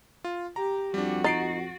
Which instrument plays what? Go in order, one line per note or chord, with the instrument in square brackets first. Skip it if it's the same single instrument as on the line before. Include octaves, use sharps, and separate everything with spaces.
[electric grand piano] F4
[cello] G4 [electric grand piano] A#5
[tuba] F2 [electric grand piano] G3 D4 [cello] F#4
[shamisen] D#4 [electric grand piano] A6 C7 D7